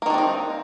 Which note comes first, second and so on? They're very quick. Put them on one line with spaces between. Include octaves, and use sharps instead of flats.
A#3 D#3 D4 C4 D#4